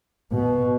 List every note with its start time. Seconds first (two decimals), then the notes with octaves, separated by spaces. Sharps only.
0.32 B2